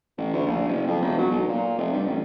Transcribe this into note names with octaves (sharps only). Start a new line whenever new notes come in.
A1
D2
A#1
F#1
F2
E1
F#3
B1
A#2
F1
G2
A1